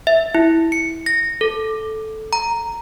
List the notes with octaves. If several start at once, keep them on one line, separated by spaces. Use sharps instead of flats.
E5
E4
C#7
A#6
A4
A#5